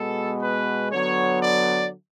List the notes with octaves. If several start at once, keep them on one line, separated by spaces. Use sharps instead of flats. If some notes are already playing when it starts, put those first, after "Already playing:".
Already playing: B2 G#3 B3 A4
B4
D3 F#3 B3 C#5
D5